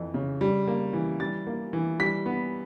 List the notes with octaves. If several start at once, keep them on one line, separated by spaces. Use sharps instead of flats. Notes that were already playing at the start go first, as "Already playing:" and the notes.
Already playing: F2 E3
C#3
G3
A#3
E3
G3 A6
A#3
E3
G3 B6
B3